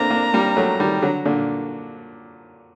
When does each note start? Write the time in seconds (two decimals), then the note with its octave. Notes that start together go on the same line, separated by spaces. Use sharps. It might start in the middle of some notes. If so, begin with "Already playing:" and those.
Already playing: A3 A#3 C4 D4 A#5
0.10 A#3 D4
0.34 G3 A#3
0.56 F#3 A3
0.79 D#3 G3
1.02 D3 F#3
1.25 A#2 D3